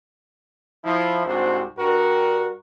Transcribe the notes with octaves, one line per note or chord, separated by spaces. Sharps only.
F3 E4
C2 G#2 C3 D4 F#4 C5
G2 F#4 A#4